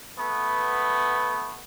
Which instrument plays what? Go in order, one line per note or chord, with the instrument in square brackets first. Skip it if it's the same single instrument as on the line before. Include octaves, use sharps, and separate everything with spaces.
[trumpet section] A3 B3